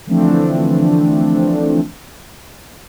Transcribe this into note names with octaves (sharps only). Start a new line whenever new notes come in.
D3 E3 F3 A3 C4 D4